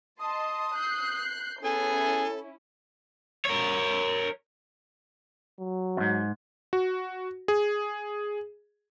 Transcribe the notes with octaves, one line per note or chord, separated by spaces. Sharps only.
D#5 A5 C6 D#6
F#6 G6 C7
B3 C#4 E4 G#4 A4 G#5
A#4 C#5
F#3
F2 G#2
F#4
G#4